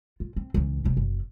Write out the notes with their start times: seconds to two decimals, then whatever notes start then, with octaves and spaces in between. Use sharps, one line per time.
0.20 F4
0.36 C4
0.54 C#2 E3
0.84 D1 C3
0.97 F#1